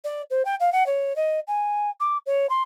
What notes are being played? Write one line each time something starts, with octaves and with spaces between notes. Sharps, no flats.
D5
C5
G5
F5
F#5
C#5
D#5
G#5
D6
C#5
C6